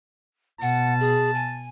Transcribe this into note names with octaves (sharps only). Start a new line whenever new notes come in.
B2 F#5 A5
G#4
G#5